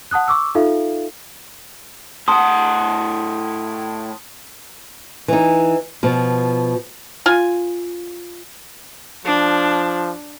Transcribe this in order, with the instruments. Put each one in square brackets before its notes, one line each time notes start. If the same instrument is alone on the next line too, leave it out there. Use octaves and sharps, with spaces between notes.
[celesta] F#5 A5 D#6 F#6
C#6 D6 E6
D#4 F4 A4 E5 F5
[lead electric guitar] A2 F#5 [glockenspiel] A5 C6 D#6
[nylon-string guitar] E3 D#4
B2 F3
[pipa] F4 G#5
[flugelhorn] F3 [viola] D4